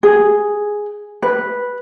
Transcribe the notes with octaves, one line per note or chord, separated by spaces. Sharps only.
G#4
B4